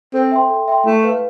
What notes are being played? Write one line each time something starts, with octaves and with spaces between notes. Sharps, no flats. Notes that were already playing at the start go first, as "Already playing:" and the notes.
C4 A4
E5 G5 C6
A4
E5 G5 C6
A3 E4
B4 F5